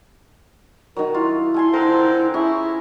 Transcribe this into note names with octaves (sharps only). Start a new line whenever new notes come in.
D#3 F#3 A#4
E4 F4
A4 G#5 C6
D3 C4 A4 A#4
C#4 E4 G#4